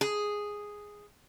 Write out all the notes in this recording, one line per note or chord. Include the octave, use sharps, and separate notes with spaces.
G#4